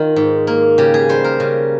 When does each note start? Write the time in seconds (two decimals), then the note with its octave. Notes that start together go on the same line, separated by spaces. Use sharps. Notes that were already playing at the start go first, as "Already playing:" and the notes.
Already playing: D#3 F4
0.16 G#2
0.47 A#3
0.78 C#3 G4
0.94 G#4
1.09 G3 C5
1.24 A#4
1.40 C#3